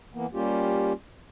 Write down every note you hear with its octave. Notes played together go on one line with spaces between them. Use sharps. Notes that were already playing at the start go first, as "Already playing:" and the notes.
E3 A#3 B3
G3 A#3 C#4 F4 G4